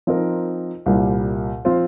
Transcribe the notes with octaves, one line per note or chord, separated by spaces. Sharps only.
F3 C4 D#4 A#4
C2 A#2 G3 A#3
F3 C4 F4 C5